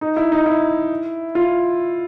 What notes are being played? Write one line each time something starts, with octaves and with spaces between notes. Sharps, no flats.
D#4
E4
D#4
E4
F4